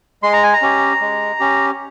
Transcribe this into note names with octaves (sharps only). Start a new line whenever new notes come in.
G#3 C6
A#5
G#5
A#5
C#4 G4
G#3
C#4 G4